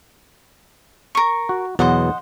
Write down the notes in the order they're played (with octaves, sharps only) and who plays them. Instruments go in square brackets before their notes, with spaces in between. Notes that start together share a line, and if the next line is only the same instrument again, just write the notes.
[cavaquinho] A#4 C#6
[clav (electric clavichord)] F#4
[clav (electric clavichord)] E2 B2 F#3 [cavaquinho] C5 D#5 F#5